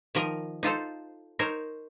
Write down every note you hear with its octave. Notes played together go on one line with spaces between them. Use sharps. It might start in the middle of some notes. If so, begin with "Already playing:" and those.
D#3 F3 A#4 D#5
D#4 F4 A4 C5
D#4 A#4 C5 C#5